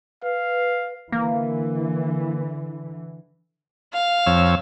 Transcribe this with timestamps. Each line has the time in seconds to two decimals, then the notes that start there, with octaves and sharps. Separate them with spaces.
0.22 B4 F5
1.12 D3 E3 A#3
3.93 F5
4.26 F2 C#5 E6